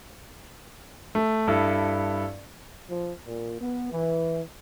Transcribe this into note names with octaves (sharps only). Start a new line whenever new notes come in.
A3
G2 E4 A4
F3
A#2
B3
E3